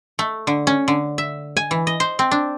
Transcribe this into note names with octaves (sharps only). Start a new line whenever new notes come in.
A3
D3
C#4
D3
E5
G#5
E3
D#5
C5
C4
D4